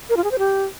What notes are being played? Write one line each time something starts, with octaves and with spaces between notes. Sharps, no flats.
A#4
F4
G#4
C5
G4